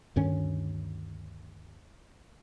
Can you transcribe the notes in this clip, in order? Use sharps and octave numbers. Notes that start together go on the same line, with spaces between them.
D2 G2 D#3 C#4